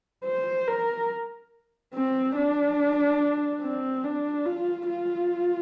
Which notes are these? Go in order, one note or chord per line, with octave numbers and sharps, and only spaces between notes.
C5
A#4
C4
D4
C4
D4
F4
F4